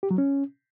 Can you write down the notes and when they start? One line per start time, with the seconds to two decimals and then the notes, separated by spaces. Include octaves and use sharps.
0.03 G4
0.11 F#3
0.18 C#4